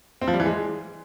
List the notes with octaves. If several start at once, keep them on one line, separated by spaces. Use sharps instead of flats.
C4
F3
G3
E3
G#3